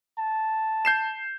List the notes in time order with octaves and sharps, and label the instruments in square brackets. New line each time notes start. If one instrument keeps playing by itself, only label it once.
[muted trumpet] A5
[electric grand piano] G6 C7 E7